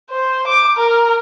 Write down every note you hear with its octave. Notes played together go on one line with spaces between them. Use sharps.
C5
D6
A#4